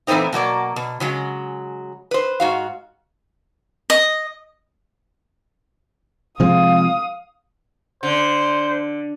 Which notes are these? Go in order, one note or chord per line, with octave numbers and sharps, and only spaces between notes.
A#2 E3 A3 B3 C4 D#4
B2 F#3 A#3 D5
B2
C#3 F#3 G#3
B4 C5
G#2 F#4 F5
D#5
C3 F3 G#3 F5 D#6
D3 C5